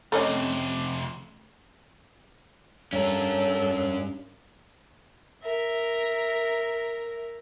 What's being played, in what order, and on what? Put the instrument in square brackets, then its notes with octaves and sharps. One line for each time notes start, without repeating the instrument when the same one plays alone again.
[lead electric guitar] F2 C3 [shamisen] A3 C#4 D#5
[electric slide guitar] G2 [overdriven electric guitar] C#4 A#4 [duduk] A4 [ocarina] C#5
[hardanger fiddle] A#4 E5